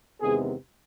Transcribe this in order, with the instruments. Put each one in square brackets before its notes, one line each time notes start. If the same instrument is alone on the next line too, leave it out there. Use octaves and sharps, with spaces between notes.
[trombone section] E2 C3 D#3 G#3 B3 G#4